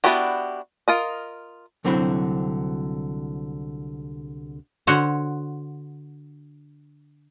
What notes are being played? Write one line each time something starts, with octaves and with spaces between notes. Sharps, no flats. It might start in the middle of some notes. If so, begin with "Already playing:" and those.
B3 D4 E4 F#4 G4
F4 A#4 D#5
C2 D3 F#3 C4 E4 B5
D3 F#4 C5 C#5 F#5